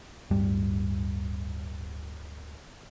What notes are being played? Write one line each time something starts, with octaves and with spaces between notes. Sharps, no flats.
D1 G2 G3